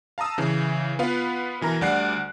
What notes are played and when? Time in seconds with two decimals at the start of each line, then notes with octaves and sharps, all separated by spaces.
0.18 F5 A5 A#5 D#6 E6
0.38 C#3 E3
0.99 B3 F4 B4 F5
1.61 B2 E3 A#4 A#5
1.81 D2 G3 D5 F#5 F#6 C7